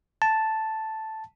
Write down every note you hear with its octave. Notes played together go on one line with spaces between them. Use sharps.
A5